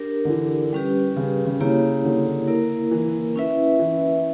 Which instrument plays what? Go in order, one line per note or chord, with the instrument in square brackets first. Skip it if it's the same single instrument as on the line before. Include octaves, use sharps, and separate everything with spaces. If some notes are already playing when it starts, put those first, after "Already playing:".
Already playing: [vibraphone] D4 G4 A#4
[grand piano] D3
E3
[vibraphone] G3 C#4 G4 B4
[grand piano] C#3
C#3
[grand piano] C#3 [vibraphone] A#3 E4 G4 C#5
[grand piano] D3
[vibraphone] A#3 E4 A#4
[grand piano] E3
[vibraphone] C#4 E4 B4 E5
[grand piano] E3